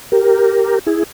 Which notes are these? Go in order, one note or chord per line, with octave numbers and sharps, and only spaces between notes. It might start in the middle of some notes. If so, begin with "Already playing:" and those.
G4 A#4
E4 G#4